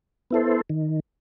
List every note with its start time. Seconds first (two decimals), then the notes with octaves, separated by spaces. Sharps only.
0.31 B3 E4 A4 C5
0.70 D#3